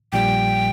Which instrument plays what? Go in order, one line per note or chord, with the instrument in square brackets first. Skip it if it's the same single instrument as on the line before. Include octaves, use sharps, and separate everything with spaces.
[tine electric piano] A#1 A#2 G3 [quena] G5